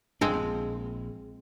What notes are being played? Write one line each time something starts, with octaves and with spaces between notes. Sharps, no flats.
E1 G2 F3 G#3 C4 D4
A#1